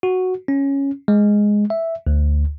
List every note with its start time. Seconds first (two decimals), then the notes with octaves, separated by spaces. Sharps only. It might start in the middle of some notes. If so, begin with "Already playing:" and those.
0.03 F#4
0.48 C#4
1.08 G#3
1.70 E5
2.07 D2